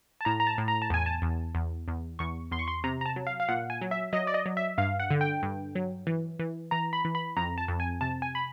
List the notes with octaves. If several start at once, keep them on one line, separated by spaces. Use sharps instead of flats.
A5
A2 A#5
A#5
A5
A2
A#5
A5
E2 G#5
A5
E2
E2
E2
E2 C#6
E2 C6
C#6
C6
C3 A#5
A#5
A5
F#3
F5
F5
A#2 F#5
G#5
F#3
E5
F#3 D#5
D5
D#5
F#3
E5
G2 F5
F#5
D3
G5
G2
F#3
E3
E3
E3 A#5
B5
E3
B5
F2 A#5
A5
F2
G#5
C3 A5
G#5
B5